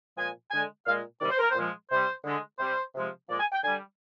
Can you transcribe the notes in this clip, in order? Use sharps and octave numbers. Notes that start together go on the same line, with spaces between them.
A#2 F3 G#3 G#5
D3 G#3 G#5
A#2 G#3 F5
C3 D#3 G3 D5
C5
A#4
C5
A#2 F3 G#3
C3 G3 C5
D3 G#3
C3 G3 C5
C3 F3 G#3
A#2 F3 G#3 D5
G#5
G5
D3 G3 G#5